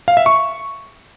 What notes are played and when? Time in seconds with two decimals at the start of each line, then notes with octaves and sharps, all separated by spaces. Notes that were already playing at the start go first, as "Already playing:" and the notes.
0.08 F5
0.17 E5
0.26 C#6